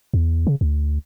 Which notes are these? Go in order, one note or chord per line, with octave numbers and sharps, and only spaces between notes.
E2
C#3
D2